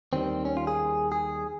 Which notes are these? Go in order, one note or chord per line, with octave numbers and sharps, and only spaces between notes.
D#2 D#3 G3 C4
C#4
F4
G#4
G#4